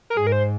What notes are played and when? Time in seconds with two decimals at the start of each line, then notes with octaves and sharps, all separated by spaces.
0.10 A#4
0.17 G#2 G#4
0.27 A#4
0.32 C5